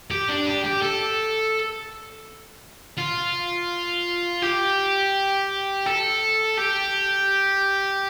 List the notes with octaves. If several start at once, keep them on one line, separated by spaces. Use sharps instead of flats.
G4
D4
G4
G4
A4
F4
G4
A4
G4